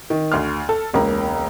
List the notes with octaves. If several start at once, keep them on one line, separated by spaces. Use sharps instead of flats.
D#3
D2 C6 F6
A4
E1 C#2 A#3 A#5